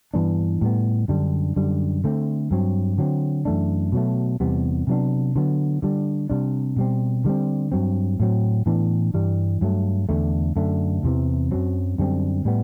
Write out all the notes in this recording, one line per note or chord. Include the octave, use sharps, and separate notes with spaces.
G2 E3 B3 D4
A2 G3 B3
F#2 D3 G3 D4
F#2 D3 G3
D3 A3 C4
G2 F#3 C4
D3 F#3 C4
F#2 E3 A3 D4
B2 F#3 A3
E2 C3 G3 B3
C3 F#3 B3 D4
D3 F#3 B3
D3 G3 D4
C3 G3 D4
B2 G3 C4
D3 G3 C4
G2 F#3 C4
A2 F#3 C4
A2 E3 B3 D4
G2 E3 G3
G2 F#3 A3
E2 D3 A3
F#2 D3 A3
E2 C3 E3
F#2 F#3 C4
F#2 D3 G3 C4
A2 G3 B3